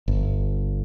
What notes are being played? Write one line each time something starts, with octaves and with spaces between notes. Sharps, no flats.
G1